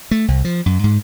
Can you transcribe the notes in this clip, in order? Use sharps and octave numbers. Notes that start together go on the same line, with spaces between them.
A3
C2
F3
F#2
G#2